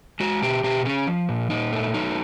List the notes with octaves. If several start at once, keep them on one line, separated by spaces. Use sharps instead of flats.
G#3 F#4
B2 G4
B2 G4
C#4 G#4
F3
A#2
A#2 D#4
A3
F#3 D#4